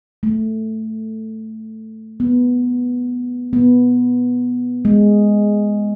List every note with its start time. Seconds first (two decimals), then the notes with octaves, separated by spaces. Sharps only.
0.23 A3
2.20 B3
3.53 B3
4.85 G#3